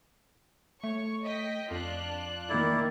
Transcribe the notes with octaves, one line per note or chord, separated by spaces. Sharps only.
A3 C#5 C#6
D#5 G5 B6
F2 D4 F4 F#6
D#3 A#3 E4 D5